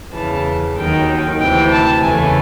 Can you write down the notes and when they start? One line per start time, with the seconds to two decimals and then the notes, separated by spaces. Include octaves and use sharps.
0.14 E2 C#3 E3 A5
0.77 D#2 D#3 F#3 G5
1.40 D2 C3 E3 G5
1.71 A5
2.02 E2 C#3 E3 A3 G#5